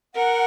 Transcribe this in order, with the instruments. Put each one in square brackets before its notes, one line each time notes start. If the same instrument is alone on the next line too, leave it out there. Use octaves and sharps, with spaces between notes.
[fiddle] A#4 [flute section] F#5